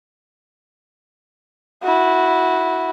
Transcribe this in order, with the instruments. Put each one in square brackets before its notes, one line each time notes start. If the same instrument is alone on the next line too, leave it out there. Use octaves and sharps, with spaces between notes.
[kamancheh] E4 F#4